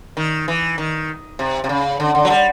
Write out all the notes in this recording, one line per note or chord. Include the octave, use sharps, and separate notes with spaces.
D#3
E3
D#3
C3
C3
C#3
D3
D3
F#3
G3